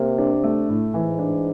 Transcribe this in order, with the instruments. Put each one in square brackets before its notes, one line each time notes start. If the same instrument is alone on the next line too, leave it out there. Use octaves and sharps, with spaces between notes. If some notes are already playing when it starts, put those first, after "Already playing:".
Already playing: [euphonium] C3 [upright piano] A#3
[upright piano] D4
A3
A2
[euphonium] G#2 [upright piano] E3
[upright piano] D4